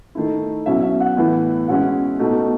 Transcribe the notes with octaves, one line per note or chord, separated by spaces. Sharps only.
D#3 A3 E4
B2 F#3 C#4 E4 E5
E5
F#5
A2 E3 B3 E4
B2 G#3 C#4 E4 F#5
B2 A3 D#4